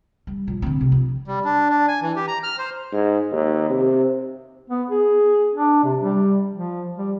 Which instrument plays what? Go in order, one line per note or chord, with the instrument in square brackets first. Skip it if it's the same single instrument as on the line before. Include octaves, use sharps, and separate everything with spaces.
[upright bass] G3
A#2 F3
D3 C4
C3
F3
[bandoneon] G3
D4
D4
G#5
E3
G4
A#5
F6
C5
[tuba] G#2
D#2
C3
[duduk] B3
G#4
D4
C3
G3
F3
G3